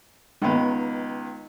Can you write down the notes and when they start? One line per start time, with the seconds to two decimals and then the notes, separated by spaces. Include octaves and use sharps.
0.42 C#2 D#3 B3 D#4